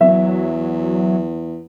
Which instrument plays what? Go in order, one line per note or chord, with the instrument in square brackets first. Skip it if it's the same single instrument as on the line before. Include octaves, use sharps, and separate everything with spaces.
[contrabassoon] E2 [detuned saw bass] F#3 [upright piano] E5